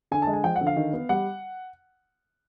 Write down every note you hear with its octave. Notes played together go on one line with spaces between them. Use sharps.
D3 G#5
A5
G#3
G#5
F3 G5
F#5
D3
F5
D#3
B3
G3 F#5